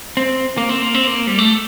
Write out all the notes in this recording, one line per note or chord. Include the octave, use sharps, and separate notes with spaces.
C4
A#3
C4
A#3
C4
A#3
G3
A3